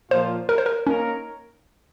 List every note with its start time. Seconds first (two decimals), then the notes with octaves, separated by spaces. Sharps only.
0.11 A#2 F3 A#3 F4 C5
0.49 A#4
0.58 C5
0.66 A#4
0.87 A#3 C#4 D#4 A#4 C#5